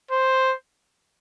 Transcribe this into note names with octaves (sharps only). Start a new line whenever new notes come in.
C5